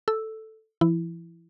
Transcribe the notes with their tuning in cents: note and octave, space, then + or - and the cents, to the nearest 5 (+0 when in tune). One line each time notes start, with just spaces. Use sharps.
A4 +0 E6 +0
E3 +45 E4 +0